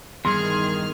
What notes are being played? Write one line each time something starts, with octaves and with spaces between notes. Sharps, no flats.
E2 G2 D#3 G#4 C6 F6